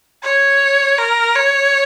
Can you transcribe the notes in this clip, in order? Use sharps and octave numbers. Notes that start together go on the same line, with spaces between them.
C#5
A#4
C#5